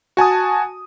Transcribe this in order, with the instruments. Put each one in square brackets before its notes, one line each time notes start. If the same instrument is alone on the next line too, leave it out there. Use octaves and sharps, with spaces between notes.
[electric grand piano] F#4 G#5 A5 D#6